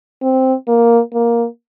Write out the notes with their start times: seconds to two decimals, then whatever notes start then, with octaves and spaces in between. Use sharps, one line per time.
0.22 C4
0.68 A#3
1.14 A#3